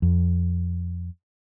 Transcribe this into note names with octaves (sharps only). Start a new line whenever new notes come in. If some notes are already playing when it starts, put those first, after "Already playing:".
F2